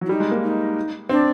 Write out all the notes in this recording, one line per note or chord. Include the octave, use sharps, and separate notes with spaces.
F#3
E4
G3 D#4
G#3
A#3
D#4
C4 D4